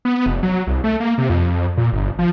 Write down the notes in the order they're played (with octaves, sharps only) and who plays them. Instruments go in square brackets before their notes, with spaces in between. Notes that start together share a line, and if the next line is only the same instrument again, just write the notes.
[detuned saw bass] B3
F1
F#3
C2
A3
A#3
C3
F2
A#2
G1
F3